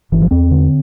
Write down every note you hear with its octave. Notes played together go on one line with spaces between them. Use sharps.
G1 E3
F3
E2 C4
D3